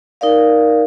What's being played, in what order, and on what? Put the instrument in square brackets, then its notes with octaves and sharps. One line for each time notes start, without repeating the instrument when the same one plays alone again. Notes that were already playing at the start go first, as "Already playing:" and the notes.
[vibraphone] D#4 A#4 D5 F5